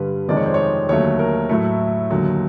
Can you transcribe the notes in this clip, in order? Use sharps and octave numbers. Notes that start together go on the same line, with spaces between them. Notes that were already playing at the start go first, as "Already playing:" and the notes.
Already playing: G2 D3 G3 B4
F2 C3 D#3 G#3 D5
C#5
C5
C#5
D#2 D3 F#3 A3 C#5
A#4
A2 F#3 A3 E4
D#2 D3 F#3